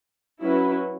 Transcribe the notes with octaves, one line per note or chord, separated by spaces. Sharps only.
F#3 C#4 E4 B4